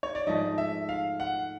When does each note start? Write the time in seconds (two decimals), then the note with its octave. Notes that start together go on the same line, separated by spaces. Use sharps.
0.03 C#5
0.15 D5
0.27 G#2 F3 A3 D#5
0.58 E5
0.89 F5
1.20 F#5